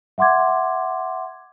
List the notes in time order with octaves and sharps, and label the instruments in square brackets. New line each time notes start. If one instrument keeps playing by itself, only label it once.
[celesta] E5 F#5 C6 D6 G#6